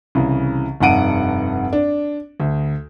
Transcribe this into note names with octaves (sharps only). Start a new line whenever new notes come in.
C2 C#3 E3
F1 G2 D#4 F#5 D7 D#7
D4
D2